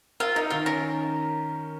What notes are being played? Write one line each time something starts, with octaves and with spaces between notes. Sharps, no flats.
F4 A#4
D#4 A#4
D#3 F4
C#4 A#4